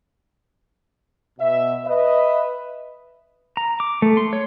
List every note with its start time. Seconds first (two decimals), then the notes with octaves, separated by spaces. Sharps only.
1.40 B2 E5
1.86 B4 D#5 E5
3.57 A#5
3.80 D6
4.02 A3
4.17 C6
4.33 C#5